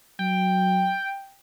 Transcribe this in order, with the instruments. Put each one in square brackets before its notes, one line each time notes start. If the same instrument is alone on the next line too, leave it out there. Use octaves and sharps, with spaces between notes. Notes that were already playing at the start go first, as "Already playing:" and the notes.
[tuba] F#3 [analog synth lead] G5